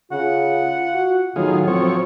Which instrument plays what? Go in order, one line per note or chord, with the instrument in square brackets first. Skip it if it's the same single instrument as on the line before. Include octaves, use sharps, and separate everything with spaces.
[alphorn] C#3 [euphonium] F4 [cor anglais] F#5
[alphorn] F#4
[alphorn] A2 [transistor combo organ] D#3 F4 G#4 [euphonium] F#3 [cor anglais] B3
[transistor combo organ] F3 C4 C#5 [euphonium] F#3